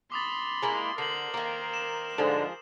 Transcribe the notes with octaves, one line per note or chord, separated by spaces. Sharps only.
B5 C6 D6 D#6 A6
G#3 A#3 E4
D3 A#4 C5 C7 F#7
D#3 A#3
E7
G#2 D3 F3 G#3 G#4